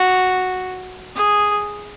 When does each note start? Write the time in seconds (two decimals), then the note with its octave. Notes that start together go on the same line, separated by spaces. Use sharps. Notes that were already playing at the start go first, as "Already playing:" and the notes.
Already playing: F#4
1.16 G#4